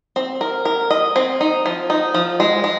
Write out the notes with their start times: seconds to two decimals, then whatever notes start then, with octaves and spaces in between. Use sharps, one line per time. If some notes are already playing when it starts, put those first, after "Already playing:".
0.16 C4
0.41 A#4
0.65 A#4
0.90 D#5
1.16 C4
1.41 D#4
1.66 F3
1.90 D#4
2.14 F3
2.40 G#3
2.64 G#3